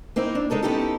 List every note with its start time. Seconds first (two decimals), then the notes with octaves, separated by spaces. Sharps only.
0.16 A#3 C4 D#4 E4
0.35 D4
0.50 G#3 D#4 A4 A#4
0.62 B3 C#4 D#4 E4 G4 A4